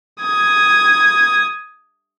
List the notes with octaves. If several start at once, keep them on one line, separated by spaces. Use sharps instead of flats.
D#6 G#6